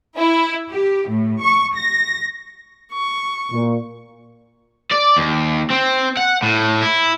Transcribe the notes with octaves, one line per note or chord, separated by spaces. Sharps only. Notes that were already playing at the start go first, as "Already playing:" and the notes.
E4
G4
A2
C#6
A#6
C#6
A#2
D5
D#2
C4
F#5
A2
E4